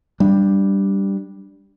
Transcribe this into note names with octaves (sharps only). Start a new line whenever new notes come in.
G3 D4